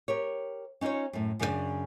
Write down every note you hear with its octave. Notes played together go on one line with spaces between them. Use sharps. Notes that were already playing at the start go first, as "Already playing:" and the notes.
G4 A#4 C#5
C#4 D#4 F4 C5 C#5
F#2 A2
F#2 C#3 D4 A4 D5 G#5